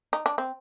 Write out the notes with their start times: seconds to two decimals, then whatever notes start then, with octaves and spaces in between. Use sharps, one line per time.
0.13 D#4
0.26 D4
0.38 C4